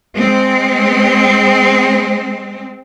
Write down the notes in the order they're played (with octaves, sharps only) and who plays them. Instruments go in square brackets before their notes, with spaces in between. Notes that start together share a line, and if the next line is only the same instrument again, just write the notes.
[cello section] G#3 C4